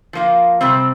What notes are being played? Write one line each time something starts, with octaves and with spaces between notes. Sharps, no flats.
F3 A#3 F4
C3 G3 C4